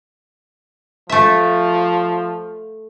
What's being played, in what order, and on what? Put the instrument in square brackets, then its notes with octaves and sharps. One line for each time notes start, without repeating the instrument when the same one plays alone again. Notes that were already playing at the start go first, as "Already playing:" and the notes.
[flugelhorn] F3 [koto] A3 E5